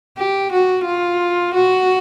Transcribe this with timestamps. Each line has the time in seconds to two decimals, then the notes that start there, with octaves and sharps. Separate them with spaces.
0.18 G4
0.52 F#4
0.85 F4
1.54 F#4